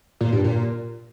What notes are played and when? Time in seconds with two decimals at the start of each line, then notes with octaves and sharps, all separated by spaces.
0.21 A#2
0.32 G2
0.44 A#2